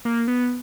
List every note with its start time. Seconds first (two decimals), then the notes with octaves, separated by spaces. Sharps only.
0.05 A#3
0.28 B3